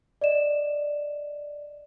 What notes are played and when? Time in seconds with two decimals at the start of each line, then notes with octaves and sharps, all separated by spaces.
0.21 D5 D#5 E7